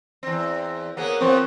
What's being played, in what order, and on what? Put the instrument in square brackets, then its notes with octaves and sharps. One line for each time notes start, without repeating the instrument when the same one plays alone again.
[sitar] E2 C4
[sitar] A#3 B3 G#4 [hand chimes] A#4 C#5 F#5
[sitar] F3 B3 [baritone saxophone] C4 [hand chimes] C#6